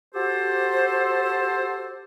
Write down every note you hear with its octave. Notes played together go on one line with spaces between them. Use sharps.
F#4 G4 A4 C5